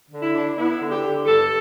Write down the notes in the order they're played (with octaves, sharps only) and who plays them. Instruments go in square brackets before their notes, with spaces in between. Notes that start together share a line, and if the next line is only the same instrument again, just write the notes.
[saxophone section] D3
E4
D4
B3 E4
D3
G4
D3
G2 A4